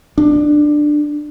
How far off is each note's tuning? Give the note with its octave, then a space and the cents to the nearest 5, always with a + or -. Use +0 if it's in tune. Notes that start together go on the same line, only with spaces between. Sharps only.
D4 +15